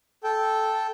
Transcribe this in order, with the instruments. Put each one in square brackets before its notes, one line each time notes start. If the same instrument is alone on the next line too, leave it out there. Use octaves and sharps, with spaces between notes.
[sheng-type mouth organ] A4 G5